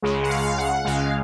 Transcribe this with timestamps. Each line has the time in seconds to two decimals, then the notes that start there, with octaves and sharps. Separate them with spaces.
0.02 C#2 C#3 G#3
0.23 F#5
0.30 F5
0.58 F#5
0.85 C#2 C#3 G#3 F5